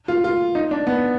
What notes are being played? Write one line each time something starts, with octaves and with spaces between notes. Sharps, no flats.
F4
F4
D#4
D4
B3